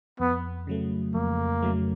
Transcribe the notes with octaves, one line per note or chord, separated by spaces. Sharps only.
F2 B3
C#3 F#3 A3
F2 A#3
C#3 F#3 A3